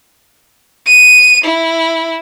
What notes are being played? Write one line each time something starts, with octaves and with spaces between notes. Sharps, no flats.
D#7
E4